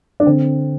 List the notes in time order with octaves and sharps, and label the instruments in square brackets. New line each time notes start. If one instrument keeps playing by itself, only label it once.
[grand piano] D4
D3 C4